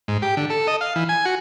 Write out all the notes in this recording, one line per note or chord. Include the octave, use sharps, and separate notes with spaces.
G#2
G4
D3
A4
D#5
F5
E3
G#5
F#4